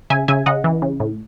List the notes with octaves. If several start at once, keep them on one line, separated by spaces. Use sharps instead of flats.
C#3 E5 G#5
C#3 E5 G#5
C#3 D#5 F#5
E3
C#3
A2